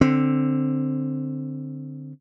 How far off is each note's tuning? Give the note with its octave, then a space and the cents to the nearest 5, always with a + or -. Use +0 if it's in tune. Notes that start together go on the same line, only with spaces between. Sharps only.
D3 +0 C4 +0